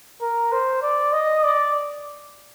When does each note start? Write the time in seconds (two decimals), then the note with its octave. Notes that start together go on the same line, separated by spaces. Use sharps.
0.22 A#4
0.52 C5
0.82 D5
1.13 D#5
1.43 D5